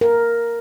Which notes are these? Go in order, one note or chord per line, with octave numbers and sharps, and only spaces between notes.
A#4